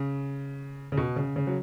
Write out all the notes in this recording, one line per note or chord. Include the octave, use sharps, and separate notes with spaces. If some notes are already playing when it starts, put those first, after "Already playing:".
Already playing: C#3
C#3
B2
C#3
C#3
F#3